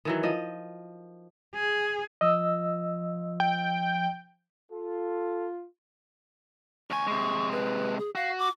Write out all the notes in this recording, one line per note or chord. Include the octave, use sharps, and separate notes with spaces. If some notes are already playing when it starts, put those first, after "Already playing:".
D#3 E3 F#3
F3 D#5
G#4
F3 D#5 E6
G5
F4 A4
D2 G#5 C#6
C3 G#3
B4
G#4
F#4 F5
D6